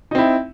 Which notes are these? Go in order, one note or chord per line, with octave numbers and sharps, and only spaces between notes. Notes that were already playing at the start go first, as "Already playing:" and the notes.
C4 D#4 E4